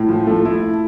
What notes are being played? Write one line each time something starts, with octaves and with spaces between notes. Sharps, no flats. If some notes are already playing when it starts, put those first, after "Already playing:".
Already playing: A2
F3
A3
E4